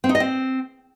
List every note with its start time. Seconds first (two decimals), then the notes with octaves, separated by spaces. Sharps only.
0.04 C4
0.09 D#4
0.15 D#5
0.20 C4